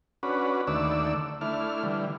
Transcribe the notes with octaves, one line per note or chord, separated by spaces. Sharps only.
C#4 D4 F#4 B4
D#2 D3 A3 D5 E6
A3 D4 E4 F6
D3 E3 G3